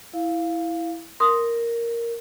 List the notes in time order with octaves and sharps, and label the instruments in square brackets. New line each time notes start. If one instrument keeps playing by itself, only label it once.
[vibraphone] E4 F5
[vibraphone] A#4 [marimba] C6 D#6